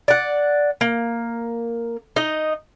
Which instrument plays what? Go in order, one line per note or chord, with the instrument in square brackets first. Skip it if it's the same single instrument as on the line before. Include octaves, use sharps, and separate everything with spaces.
[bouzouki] D5 F#5
A#3
D#4 D#5